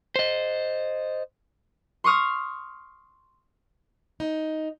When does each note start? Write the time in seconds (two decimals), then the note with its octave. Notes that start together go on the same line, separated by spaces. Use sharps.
0.16 C5 D#5
2.04 C6 C#6 D#6 F6
4.20 D#4